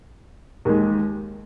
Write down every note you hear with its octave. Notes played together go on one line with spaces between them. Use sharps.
D#2 D#3 G#3